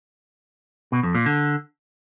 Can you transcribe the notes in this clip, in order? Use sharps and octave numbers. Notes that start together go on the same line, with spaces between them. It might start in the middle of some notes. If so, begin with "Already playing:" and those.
B2
F2
A#2
D3